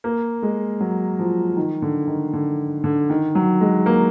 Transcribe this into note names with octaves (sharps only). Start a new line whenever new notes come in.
A#3
G#3
F#3
F3
D#3
D3
D#3
D3
D3
D#3
F#3
G#3
A#3